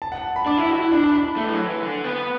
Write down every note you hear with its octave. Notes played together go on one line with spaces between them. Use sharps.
A5
F#5
A5
B5
D4 D6
E4
F#4
E4
D4 B5
A5
B5
A3
E3
F#3
E3
D3
B3